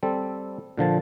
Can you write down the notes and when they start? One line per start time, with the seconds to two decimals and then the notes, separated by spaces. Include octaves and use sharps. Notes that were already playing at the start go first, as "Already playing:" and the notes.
0.03 G3 C4 A4
0.78 A#2 D3 F3 A5